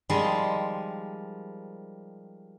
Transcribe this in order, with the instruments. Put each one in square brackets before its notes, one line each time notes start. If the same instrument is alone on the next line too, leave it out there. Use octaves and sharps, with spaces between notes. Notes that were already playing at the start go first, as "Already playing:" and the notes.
[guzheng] D#3 F3 G3 G#3